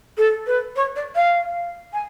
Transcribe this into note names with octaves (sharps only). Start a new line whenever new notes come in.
A4
B4
C#5
D5
F5
G#5